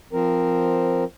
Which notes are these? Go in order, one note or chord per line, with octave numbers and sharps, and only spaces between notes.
F3 C4 A#4